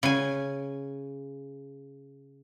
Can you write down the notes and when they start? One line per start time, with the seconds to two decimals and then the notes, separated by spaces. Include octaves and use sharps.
0.03 C#3 G#5